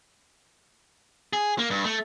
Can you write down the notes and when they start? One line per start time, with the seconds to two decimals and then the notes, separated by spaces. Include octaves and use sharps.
1.33 G#4
1.59 A#3
1.70 G2
1.84 A3